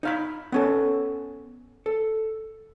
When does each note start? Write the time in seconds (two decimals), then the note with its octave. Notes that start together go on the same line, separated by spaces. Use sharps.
0.03 D#4 F5 B5
0.52 B3 C#4 A4
1.86 A4